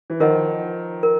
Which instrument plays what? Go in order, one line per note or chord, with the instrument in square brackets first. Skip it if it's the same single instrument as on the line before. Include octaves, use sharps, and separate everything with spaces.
[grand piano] E3
[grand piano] D#3 F3 [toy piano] A#4 D#5 F#5
[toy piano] A#4